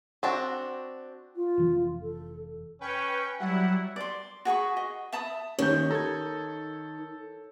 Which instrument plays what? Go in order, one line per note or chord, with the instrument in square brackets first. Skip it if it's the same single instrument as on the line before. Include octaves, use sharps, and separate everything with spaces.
[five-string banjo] C4 D4 F#4
[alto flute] F4
[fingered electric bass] F1 E3
[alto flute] A4
[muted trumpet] C#4 [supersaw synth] B4 G5 C#6
[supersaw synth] F#3 G3 F#5 [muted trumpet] E4
[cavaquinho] D5 C6
F#4 G#4 B5 C#6
D#5
E5 A5 B5 D#6
[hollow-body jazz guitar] D#2 C#4 G4 [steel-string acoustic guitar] D#3 [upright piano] C#5 G6
[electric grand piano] A4 G#6 [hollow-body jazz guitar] A#5